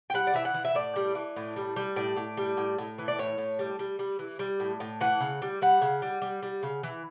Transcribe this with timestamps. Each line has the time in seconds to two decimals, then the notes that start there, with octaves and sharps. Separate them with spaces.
0.10 G5
0.14 G3 F#5
0.27 D5
0.34 E3 E5
0.45 F#5
0.54 E3
0.65 E5
0.75 A2 D5
0.96 G3
1.15 E3
1.36 A2
1.56 G3
1.76 G3
1.96 A2 D5
2.17 A2
2.37 G3
2.57 A2
2.78 A2
2.98 E3
3.08 D5
3.19 A2 C#5
3.38 A2
3.59 G3
3.79 G3
3.99 G3
4.19 E3
4.39 G3
4.60 A2
4.80 A2
5.01 E3 F#5
5.20 C#3
5.42 G3
5.62 G3 F#5
5.81 C#3
6.02 G3
6.22 G3
6.42 G3
6.63 C#3
6.83 E3